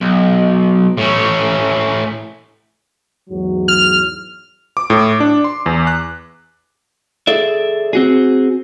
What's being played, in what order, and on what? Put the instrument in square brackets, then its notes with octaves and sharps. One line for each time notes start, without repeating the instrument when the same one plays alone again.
[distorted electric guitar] B1
A2 C#4
[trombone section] E2 G#2 F#3
[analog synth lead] F6
[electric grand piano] D6
A2
D4
C6
E2
F#6
[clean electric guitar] G#4 A4 D5 E5
C4 F#4 G#4